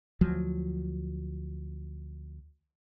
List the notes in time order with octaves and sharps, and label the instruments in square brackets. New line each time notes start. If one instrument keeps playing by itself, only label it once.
[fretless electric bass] D2 F3 F#3